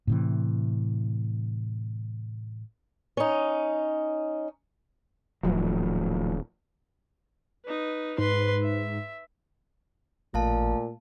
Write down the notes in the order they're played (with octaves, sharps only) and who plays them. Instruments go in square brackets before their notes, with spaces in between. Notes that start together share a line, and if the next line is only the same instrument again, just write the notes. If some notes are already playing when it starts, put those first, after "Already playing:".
[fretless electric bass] A2 C3 E3
[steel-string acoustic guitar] C#4 D#4
[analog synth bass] D#1 [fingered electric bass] A2 F3 F#3
[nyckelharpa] D#4 B4
[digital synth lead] G#2 [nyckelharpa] B4 C6
[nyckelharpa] E5
[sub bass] A1 [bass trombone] A#2 [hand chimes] A3 F5 A5